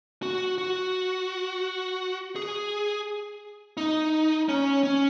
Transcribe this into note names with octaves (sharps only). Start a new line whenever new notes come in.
F#4
F#4
G#4
D#4
C#4
C#4